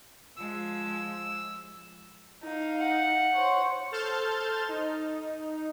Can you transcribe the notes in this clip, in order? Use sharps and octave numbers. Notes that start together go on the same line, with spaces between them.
F3 G#3 E6
D#4 F5
F#5
C5 C#5
A4 C5 A5 F6 G6 A6
D#4